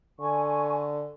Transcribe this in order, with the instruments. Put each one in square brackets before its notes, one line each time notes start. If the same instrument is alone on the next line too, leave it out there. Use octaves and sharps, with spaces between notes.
[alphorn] D3 [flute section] G#5 C#6